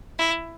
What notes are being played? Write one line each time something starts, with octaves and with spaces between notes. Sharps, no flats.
E4